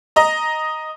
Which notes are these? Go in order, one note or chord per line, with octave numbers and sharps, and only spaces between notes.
D#5 A#5